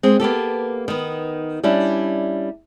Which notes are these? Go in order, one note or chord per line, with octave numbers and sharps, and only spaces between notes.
G#3 C4
A#3 B3 G4 A4
D#3 B3
G3 C#4 D4 E4